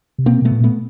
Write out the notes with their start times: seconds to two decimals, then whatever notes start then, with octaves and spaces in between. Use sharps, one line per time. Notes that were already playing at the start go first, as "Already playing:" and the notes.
0.18 C3
0.26 B2 A#3 C4
0.42 B2 A3 B3
0.51 A#2
0.64 A3 B3